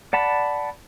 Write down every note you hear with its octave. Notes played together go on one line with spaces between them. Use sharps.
D5 F#5 A5 B5